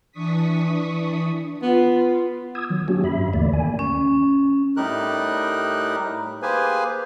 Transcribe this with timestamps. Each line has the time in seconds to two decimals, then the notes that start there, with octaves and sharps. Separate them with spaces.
0.11 E3 D4 C#6 D#6 B6
1.63 B3 F4
2.55 D#6 E6 G#6
2.70 D#3 F#3
2.88 F#3 A#3 C#4 D4 F#4 G4
3.04 G2 E5 B5
3.34 D#2 D3 E3 A3 A#3 D5
3.53 D#3 A#3 G#5
3.79 C#4
4.77 A2 G3 D#4 G4 A#4 F#6
6.42 A#3 G4 G#4 B4 C5 G#5